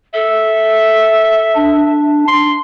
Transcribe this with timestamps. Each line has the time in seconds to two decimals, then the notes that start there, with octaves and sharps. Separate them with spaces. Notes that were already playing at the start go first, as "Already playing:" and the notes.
0.14 A4 E5
1.55 D4
2.28 C6